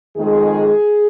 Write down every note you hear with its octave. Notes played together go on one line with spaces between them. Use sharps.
F2 D#3 G#3 G#4